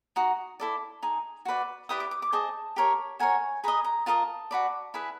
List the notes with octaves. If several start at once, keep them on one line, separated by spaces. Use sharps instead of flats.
D#4 F#4
E4 A4 D5
D#4 G#4
F#4 B4 D5
E4 G4 B4 D5 D#6
D6
D6
D6
G#4 C5 D#5 A5
G4 A#4 C#5
F#4 A#4 C#5 G#5
G#4 B4 D#5 A#5
A#5
F4 A#4 D#5 A5
F#4 B4 D5
E4 G#4 B4